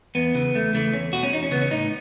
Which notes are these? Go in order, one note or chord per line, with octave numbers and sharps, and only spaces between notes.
E2 B3
C#3 E3
E2 A3
C#3 E3 A3
E2 C#4
B2 F#4
C#4
E2 D#4
C#4
C#3 E3 B3
C#4
A2 D#4